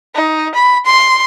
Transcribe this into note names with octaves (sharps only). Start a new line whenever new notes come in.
D#4
B5
C6